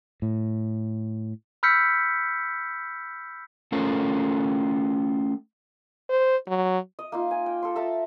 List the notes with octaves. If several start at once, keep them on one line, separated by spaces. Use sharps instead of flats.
A2
B5 E6 F6 G6 B6 C#7
A3 C#4 F4 A4 A#4
C5
F#3
D#5
A#3 D#4 F4
G#5
G5
A4 C6
A4 E5 A5 A#5